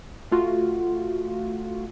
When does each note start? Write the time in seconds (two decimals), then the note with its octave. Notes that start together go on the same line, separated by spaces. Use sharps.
0.32 A3 F4 F#4